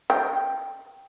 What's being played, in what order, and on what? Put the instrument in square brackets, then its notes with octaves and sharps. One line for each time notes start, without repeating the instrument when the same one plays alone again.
[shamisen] G5